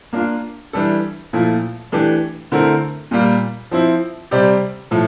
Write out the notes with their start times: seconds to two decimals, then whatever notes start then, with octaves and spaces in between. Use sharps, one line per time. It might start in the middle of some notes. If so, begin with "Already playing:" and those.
0.13 A#3 D4 F4
0.73 E3 G3 D4 A4
1.33 A#2 F3 A3 E4
1.92 E3 A3 D4 G4
2.52 D3 A3 C4 E4 A#4
3.11 A#2 G3 A#3
3.71 F3 C4 E4
4.31 C3 G3 C4 G4 D5
4.91 A2 F3 A3